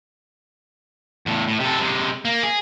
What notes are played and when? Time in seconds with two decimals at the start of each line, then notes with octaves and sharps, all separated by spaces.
1.26 E2 A2
1.48 A2
1.60 C3 A4
1.79 C3 G#3
2.25 A#3
2.43 G#4